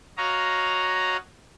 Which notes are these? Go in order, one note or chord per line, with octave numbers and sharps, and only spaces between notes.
F#4 C#5 D#5 F5 A#5